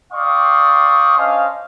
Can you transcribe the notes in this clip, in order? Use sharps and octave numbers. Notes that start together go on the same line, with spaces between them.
D5 F5 G5 C6 C#6 D#6
C#4 D4 C5 D#5 F5